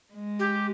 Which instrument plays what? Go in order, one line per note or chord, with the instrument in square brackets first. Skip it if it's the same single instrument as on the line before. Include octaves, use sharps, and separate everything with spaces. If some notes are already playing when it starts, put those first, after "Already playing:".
[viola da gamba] G#3
[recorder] G4